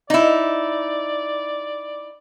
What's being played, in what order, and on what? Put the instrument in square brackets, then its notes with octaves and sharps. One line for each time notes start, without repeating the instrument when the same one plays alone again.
[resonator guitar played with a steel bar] D#4 E4 [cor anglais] D5